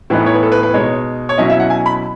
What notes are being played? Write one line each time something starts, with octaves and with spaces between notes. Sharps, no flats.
A2 E3 B3 D#4 B4
C#5
B4
A4
B4
B4
B2 G#3 D#4 C#5
C#5
B2 F#3 C#4 E4 D#5
E5
F#5
G#5
B5